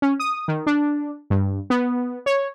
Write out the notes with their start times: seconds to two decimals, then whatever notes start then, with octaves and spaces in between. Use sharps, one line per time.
0.02 C#4
0.20 D#6
0.48 D#3
0.67 D4
1.30 G2
1.70 B3
2.26 C#5